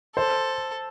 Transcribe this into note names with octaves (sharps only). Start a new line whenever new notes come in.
A4 C5